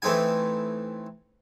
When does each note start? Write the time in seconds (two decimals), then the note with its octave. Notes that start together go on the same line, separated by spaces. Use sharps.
0.02 E3 A3 C4 D#4 G#5